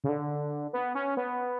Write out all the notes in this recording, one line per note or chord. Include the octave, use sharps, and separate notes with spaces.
C#3
D3
B3
C#4
B3